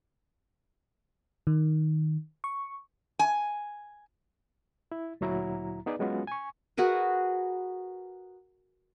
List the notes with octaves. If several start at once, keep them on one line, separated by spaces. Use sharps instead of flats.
D#3
C#6
G#5
E4
D2 A#2 F#3 E4 A#5
B3 D#4 G#4 B4 D5
F#3 G#3 B3 C#4 F4 F#4
G#5 C#6
F#4 G#4 A#4 B4